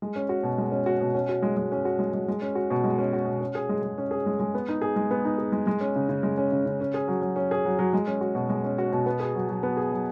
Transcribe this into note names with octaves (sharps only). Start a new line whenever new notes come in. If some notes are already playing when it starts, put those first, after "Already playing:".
G#3
C#4
F#4
B2
G#3
C#4
F#4
B2
C#4
F#4
G#3
G#3
C#4
F#4
G#3
G#3
G#3
C#4
F#4
B2
G#3
C#4
F#4
B2
C#4
G#4
G#3
G#3
C#4
G#4
G#3
G#3
B3
D#4
G#4
G#3
B3
D#4
G#4
G#3
G#3
C#4
C#3
C#3
G#3
C#4
C#3
C#3
C#4
G#4
F#3
F#3
C#4
G#4
F#3
F#3
G#3
C#4
F#4
B2
G#3
C#4
F#4
B2
B3
G#4
F#3
F#3
B3
G#4
F#3